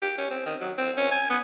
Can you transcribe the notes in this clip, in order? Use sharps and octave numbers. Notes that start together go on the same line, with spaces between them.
G4
C#4
C4
D#3
F#3
C4
C#4
G#5
B3